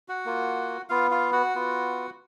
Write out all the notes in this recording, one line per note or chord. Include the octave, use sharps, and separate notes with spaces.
F#4 F#5
A#3 F4
B3 F4 F5
F4 F5
F#4 F#5
B3 F4